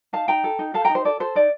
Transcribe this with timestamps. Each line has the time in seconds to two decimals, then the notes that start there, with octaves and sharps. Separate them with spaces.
0.13 D#4 F5 A5
0.28 D#4 G5 A#5
0.44 A4
0.59 D#4
0.74 A4 F5 A5
0.85 G5 A#5
0.89 D#4
0.95 C5
1.05 A4 D5
1.20 A4 C5
1.35 D#4 D5